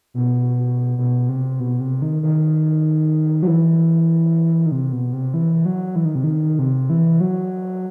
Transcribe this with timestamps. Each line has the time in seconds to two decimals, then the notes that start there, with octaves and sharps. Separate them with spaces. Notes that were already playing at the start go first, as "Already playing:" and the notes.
0.14 B2
0.98 B2
1.29 C3
1.60 B2
1.80 C3
2.02 D#3
2.23 D#3
3.43 F#3
3.47 E3
4.66 D#3
4.72 C3
4.93 B2
5.13 C3
5.34 E3
5.65 F#3
5.96 E3
6.05 D#3
6.15 C3
6.24 D#3
6.59 C3
6.90 E3
7.20 F#3